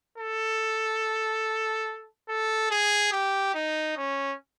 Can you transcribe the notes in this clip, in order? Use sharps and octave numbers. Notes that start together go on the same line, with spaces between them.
A4
A4
G#4
G4
D#4
C#4